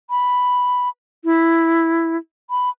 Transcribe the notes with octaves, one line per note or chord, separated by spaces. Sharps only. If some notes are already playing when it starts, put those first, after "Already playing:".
B5
E4
B5